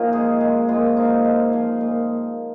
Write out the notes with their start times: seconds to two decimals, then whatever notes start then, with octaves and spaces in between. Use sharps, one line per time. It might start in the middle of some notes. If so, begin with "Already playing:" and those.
Already playing: A#2 F3 C#4 D#4 F4
0.13 G#3 G#4
0.41 G#3 G#4
0.69 A#2 F4
0.97 F3 D#4
1.25 G#3
1.53 F3
1.81 A#2